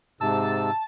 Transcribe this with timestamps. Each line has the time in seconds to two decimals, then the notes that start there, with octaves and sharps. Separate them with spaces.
0.21 G#2 C3 A5 E6